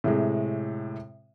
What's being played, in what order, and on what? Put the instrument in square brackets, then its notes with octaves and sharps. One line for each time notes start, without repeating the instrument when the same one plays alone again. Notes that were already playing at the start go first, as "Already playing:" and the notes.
[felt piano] A2 C3 G#3